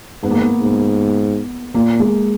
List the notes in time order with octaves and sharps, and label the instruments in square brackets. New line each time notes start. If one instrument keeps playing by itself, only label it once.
[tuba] G#2 [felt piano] B3
[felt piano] A#3
B3
[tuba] G#2
[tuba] A#2 [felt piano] A#3
[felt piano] G#3